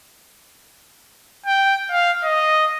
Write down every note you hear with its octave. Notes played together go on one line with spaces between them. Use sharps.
G5
F5
D#5